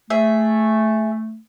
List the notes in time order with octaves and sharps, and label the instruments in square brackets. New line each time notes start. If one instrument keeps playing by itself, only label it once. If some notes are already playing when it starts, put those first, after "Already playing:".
[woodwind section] A3 [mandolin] G#4 E5